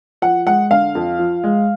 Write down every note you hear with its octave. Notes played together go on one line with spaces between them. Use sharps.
F3 F#5
G#3 F#5
D3 F5
F2
F3
G#3